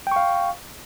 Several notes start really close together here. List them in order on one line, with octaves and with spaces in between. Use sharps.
G5 C#6 F5